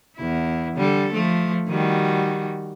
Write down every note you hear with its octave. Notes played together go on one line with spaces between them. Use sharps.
E2 E4
D3 G3 A4
F3 A3
D#3 G3 F#4